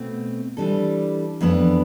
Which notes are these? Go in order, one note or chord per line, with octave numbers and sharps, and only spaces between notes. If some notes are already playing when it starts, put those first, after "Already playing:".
Already playing: B2 A3 C4
E3 G3 D4 A4
F2 E3 B3 D4